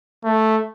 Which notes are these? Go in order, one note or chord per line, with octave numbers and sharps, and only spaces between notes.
A3